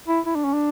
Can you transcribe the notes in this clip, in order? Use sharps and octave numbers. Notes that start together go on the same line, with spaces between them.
E4
E4
D4
C#4
D4